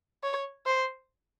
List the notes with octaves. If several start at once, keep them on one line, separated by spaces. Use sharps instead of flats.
C#5
C5